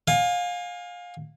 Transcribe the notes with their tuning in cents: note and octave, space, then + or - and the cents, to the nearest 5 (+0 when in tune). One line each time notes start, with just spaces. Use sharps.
F5 +25 G#5 -20